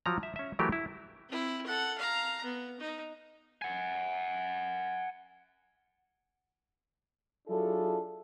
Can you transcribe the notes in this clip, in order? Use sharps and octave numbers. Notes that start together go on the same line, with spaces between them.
F3 F#3 A#5
E5
C#4 E5
E3 F#3 A3 G4 A#4
E4
C4 E4
A4 F#5
F5 A#5
B3
D#4
F#5 G#5
F#3 D4 E4 F4 G#4 A4